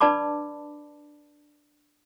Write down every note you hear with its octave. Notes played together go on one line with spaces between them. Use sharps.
D4 B4 D5 A5 B5 D6